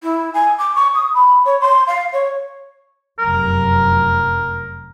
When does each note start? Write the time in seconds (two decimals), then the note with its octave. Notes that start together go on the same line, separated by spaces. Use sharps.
0.03 E4
0.34 G#5
0.58 D6
0.75 C#6
0.94 D#6
1.14 B5
1.45 C#5
1.61 C6
1.87 F5
2.13 C#5
3.19 F1 F#2 F#3 A#4